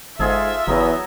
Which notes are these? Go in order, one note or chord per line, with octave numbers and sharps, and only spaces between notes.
G1 G#2 F4 G#4 A4 E5
F#1 E2 F#3 B3 D#5